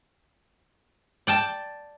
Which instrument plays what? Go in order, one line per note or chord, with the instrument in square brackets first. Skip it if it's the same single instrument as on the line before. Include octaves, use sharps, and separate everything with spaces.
[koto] D5 G5 A5